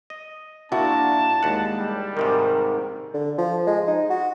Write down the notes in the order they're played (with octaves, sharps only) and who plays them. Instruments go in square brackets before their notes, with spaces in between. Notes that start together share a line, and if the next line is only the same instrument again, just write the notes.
[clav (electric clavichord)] D#5
[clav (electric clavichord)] A#2 [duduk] D4 [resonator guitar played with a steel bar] E4 F#4 [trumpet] A5
[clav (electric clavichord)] D#2 F#5 [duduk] G#3
[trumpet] G3
[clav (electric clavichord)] G#2 C3 D#3 [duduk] A#4
[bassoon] D3
F3
G#3
D#4
F#4